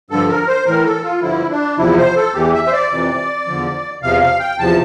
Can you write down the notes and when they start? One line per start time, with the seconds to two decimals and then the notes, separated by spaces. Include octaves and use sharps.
0.10 G2 D3 F3 A4
0.29 A#4
0.48 C5
0.66 A2 E3 A#4
0.85 A4
1.04 F4
1.22 G2 D3 F3 E4
1.50 D4
1.78 E2 C3 F3 E4
1.98 C5
2.16 A4
2.34 E2 E3 G4
2.54 E5
2.67 C5
2.72 D5
2.91 F2 C3 E3
3.47 E2 D3 F3
4.02 E2 C3 F3 F5
4.21 F5
4.40 G5
4.58 E2 C3 F3 A5